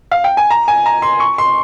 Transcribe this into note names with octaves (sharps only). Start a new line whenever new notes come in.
F5
G5
G#5
A#5
G#5
A#5
C6
C#6
C6